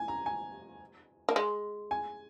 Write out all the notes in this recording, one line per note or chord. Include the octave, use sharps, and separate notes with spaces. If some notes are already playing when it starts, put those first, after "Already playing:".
Already playing: G#5
A#5
G#5
A#3
G#3
G#5